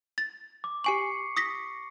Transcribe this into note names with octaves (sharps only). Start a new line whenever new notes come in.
A6
D6
G4 G#5 C#6 C7 C#7 F#7
D#6 A#6 B6